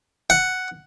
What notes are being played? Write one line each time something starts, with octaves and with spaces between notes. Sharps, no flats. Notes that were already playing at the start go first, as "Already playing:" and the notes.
F#5